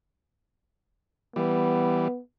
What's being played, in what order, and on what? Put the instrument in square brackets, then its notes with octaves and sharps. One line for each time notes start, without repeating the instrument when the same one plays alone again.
[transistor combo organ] E3 G3 [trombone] B3